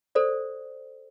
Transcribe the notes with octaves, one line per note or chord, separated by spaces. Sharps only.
A4 C5 D5